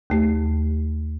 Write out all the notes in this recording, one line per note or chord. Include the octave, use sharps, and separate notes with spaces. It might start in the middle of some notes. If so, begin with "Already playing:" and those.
D#2 A3 G4